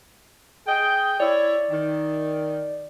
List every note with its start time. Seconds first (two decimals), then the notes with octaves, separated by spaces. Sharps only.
0.67 G#4 D#5 G5
1.20 E4 C#5 D5
1.70 D#3